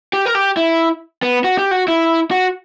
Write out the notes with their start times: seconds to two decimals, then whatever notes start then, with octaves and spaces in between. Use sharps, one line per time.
0.13 G4
0.26 A#4
0.35 G4
0.57 E4
1.23 B3
1.44 F#4
1.58 G4
1.71 F#4
1.88 E4
2.31 F#4